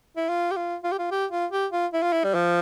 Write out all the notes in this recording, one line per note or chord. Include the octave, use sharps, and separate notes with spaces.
E4
F4
G4
F4
F4
G4
F4
G4
F4
G4
F4
E4
F4
E4
G3
F3